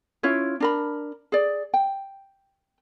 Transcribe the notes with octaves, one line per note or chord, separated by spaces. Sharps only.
C#4 E4 F4 C#5
D4 A#4 B5
G#4 D5
G5